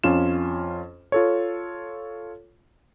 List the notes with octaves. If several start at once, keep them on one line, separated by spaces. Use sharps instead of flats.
F2 C#4 F4 E7
F4 A4 C#5